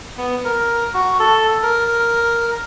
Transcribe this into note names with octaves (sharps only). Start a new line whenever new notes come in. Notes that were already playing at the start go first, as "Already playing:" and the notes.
B3
A#4
F#4
A4
A#4